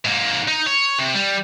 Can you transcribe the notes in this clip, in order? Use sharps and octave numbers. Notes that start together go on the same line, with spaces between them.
G#2 A#3
D#4
C#5
C3
G3